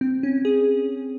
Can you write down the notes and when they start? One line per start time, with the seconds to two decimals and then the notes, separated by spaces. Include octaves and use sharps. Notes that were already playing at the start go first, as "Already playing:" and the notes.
0.01 C4
0.23 C#4
0.45 G#4